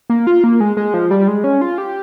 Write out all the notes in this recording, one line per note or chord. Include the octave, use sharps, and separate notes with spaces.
A#3
F4
A#3
G#3
G#3
F3
G3
G#3
C#4
F4
G4